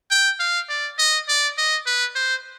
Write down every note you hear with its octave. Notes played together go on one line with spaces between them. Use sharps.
G5
F5
D5
D#5
D5
D#5
B4
C5